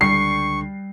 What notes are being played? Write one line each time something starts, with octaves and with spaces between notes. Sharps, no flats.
C#2 D3 G3 D4 C#6 C7